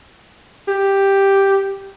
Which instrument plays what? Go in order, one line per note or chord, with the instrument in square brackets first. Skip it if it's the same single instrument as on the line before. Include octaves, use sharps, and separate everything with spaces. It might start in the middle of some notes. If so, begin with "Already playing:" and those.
[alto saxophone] G4